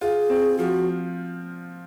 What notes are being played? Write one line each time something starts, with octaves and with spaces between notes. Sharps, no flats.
F4 G#4
C4
F3 F#4